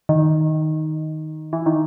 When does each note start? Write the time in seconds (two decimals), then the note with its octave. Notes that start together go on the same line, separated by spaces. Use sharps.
0.09 D#3
1.53 E3
1.66 D#3